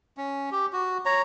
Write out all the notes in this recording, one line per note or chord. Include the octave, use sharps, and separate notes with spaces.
C#4
G4
F#4
C#5 A#5